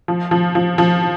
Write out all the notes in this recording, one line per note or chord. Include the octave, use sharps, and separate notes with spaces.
F3
F3
F3
F3